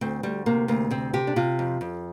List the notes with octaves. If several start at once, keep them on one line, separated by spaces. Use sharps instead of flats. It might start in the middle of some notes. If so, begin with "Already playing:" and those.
D2 C4
D2 G3
C3 A#3
D2 A#3
C3 C4
C3 G4
D4
C3 F4
F2
F2